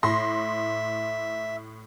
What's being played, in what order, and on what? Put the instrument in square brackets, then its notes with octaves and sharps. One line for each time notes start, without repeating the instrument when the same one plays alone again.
[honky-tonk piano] A2 C6 A#6 [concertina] E5